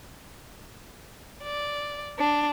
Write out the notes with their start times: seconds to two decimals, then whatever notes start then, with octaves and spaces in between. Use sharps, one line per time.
1.44 D5
2.18 D4